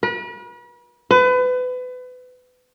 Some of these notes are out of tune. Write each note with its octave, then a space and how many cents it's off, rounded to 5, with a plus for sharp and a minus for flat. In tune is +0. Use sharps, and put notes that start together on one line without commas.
B4 -40
B4 +30